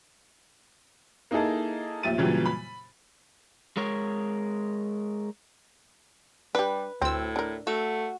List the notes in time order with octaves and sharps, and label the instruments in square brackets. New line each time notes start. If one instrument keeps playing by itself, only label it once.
[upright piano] A#3 D#4 E4 G#4 A4
A1 D#2 F3 E5 A6 D#7
F2 A#2 C#3 E3 F#3 G3
B5
[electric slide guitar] G#3 A#4 C#5
[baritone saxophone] G3 [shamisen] D4 G4 [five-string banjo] B4
[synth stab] D2 E6 [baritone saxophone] A2 [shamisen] C4
[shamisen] D4 A#4
[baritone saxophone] A3 [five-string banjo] F#4 [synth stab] E6